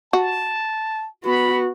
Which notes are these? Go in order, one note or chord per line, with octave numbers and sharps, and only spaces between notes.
F#4 A5
B3 F#4 B5